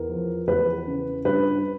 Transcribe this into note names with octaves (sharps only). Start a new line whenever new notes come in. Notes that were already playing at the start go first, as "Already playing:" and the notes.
Already playing: E2 A#4
F3
E2 B4
C#3
G2 B4